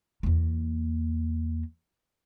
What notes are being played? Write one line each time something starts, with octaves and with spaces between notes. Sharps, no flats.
E2 A#3